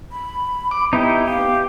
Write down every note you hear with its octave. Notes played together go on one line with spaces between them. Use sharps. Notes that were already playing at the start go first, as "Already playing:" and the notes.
B5
D6
B3 D#4 E4 G4
G4 F5